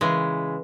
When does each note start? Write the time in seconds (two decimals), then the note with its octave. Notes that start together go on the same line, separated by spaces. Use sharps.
0.01 C#3 E3 G#3